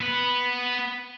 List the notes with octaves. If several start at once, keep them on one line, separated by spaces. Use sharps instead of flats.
B3 B4